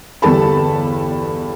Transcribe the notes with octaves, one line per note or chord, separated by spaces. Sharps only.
G1 E2 G3 A4 A5 B5